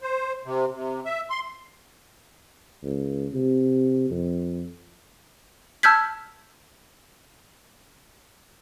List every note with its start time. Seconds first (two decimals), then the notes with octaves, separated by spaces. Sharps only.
0.01 C5
0.45 C3
0.74 C3
1.05 E5
1.30 C6
2.83 C#2
3.33 C3
4.10 F2
5.83 A5 E6 F6 G6 G#6 B6